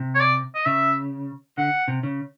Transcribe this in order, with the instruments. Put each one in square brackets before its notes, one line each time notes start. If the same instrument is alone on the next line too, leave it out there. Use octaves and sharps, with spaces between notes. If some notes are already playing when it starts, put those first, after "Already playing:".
Already playing: [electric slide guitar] C3
[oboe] C#5
D5
D#5
[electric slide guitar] C#3 [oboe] E5
[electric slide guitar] D3 [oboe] F#5
[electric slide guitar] C3
C#3